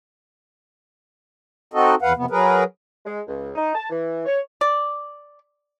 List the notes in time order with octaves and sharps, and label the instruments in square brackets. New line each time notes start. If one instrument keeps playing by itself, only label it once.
[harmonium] C4 D#4 F#4 A4 D#5
E2 B4 F5 F#5
F2 C3 B3
F#3 G#4 A#4 B4
[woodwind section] G#3
C#2
D#4
A5
E3
C#5
[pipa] D5